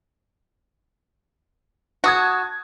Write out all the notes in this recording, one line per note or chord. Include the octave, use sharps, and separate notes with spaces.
F#4 A5 D#6 G#6